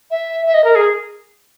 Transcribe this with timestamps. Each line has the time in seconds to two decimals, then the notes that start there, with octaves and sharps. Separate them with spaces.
0.11 E5
0.46 E5
0.54 D#5
0.64 A#4
0.75 G#4